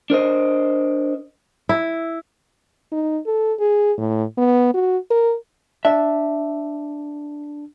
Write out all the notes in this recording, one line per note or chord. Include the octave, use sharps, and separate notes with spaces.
D4 A#4 C5 D#5
E4
D#4
A4
G#4
A2
B3
F#4
A#4
D4 E5